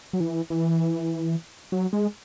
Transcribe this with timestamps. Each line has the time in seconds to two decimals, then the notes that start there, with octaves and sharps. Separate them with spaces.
0.13 F#3
0.20 E3
0.50 E3
1.72 F#3
1.93 G#3